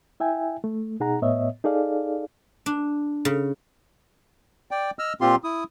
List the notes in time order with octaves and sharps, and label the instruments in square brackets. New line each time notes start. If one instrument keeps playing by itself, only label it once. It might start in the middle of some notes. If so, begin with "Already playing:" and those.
[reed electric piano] E4 E5 G5 G#5
A3
B2 D#4 G#4 F#5 A#5
A2 B3 C#5 D#5 E5
D#4 G#4 A4 D5 F5
[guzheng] D4
C#3
[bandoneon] D5 G5
D#5 E6 F6
A#2 C4 F4 G4 C6
E4 D#6